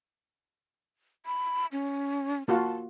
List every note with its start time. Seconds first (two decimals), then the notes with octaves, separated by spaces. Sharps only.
1.26 B5
1.72 C#4
2.48 A#3 F4 F#4 A5